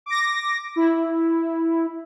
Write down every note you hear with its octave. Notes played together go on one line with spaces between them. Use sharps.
D6 A#6
E4